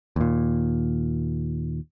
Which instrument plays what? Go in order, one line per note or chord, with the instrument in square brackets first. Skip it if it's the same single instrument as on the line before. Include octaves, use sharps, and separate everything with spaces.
[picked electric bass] D#2 A#2